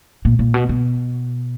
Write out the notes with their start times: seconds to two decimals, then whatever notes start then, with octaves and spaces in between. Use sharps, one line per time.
0.25 A#2
0.39 A#2
0.54 B2
0.69 B2